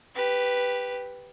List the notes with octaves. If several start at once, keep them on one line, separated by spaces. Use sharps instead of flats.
G4 B4